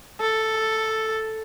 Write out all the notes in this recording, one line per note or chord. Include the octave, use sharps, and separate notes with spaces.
A4